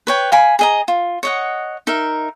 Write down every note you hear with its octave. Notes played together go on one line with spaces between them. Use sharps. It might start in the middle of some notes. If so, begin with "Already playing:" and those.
B4 C#5 G5
F5 G#5 B5
G#4 D#5 A#5
F4
C#5 D#5 F#5
D#4 A#4 E5